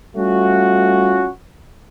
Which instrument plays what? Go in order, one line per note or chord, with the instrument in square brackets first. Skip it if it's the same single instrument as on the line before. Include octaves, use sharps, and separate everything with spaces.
[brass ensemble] G3 A3 C#4 F4 F#4